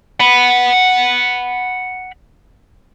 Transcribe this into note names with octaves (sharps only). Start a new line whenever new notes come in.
F#5 B5